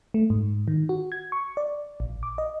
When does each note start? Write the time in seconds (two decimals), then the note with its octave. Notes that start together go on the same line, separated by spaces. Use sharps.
0.14 A3
0.30 G#2
0.68 D#3
0.89 F#4
1.12 G#6
1.32 C#6
1.57 D5
2.00 A#1
2.23 D6
2.38 D#5